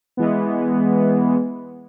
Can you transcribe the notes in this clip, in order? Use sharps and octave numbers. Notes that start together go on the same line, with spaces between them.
E3 G#3 B3